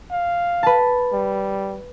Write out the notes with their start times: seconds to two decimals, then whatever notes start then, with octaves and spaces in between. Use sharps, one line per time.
0.11 F5
0.63 B4 A5
1.13 G3